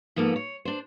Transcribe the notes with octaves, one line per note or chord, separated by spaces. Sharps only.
G#2 F3 A#3 B3 A4
C#5
D4 C5